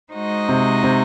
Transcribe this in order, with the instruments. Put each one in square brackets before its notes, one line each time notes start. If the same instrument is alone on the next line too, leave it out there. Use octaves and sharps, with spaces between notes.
[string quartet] G#3 D#4 F#4 C5 D#5
[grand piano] C3
C3